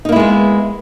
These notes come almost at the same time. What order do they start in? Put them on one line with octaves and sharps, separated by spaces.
D#4 A#3 E4 G#3 B3